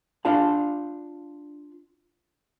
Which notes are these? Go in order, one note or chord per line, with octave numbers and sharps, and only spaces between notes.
D4 F4 D5 F5 A5